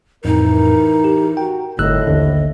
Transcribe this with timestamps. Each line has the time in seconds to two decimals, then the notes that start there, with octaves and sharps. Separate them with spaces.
0.25 F2 A2 E3 D#4 A#4
1.04 G4
1.37 F#4 A#4 G5
1.79 G1 A2 D#5 E6 F#6
2.07 A1 D#2 D3